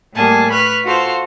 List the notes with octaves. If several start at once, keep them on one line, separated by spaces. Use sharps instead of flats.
A2 G3 A#3 G#4 G#5 A5
B4 B5 C#6 F6 F#6
F4 F#4 A4 C5 F5